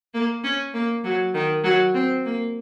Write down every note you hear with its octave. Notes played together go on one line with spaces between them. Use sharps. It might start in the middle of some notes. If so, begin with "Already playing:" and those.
A#3
C#4
A#3
F#3
D#3
F#3
C4
A#3